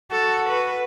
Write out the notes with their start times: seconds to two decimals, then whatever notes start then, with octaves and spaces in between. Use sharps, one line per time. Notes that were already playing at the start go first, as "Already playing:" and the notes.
0.11 F#4 A4
0.49 B4